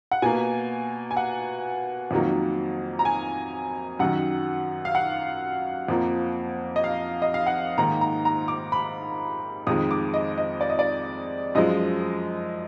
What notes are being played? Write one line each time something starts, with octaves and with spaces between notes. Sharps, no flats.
F#5
B2 A#3 G#5
G#5
F#5
F2 D#3 F#3 A#3
A#5
G#5
F#2 D#3 F#3 F#5
F5
F#5
F2 F3 A#3
D#5
F5
D#5
F5
F#5
G#2 D#3 A#3 A#5
A#5
A#5
D6
B5
F2 D#3 G#3 D#6
D6
D#5
D#5
D5
D#5
D5
F#2 F3 G#3 D#5